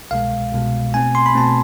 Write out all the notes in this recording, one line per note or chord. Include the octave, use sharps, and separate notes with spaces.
C2 B2 G#3 F5
C2 B2 G#3
B2 A3 C4 G#5
C6
B5
B2 A3 C4 A5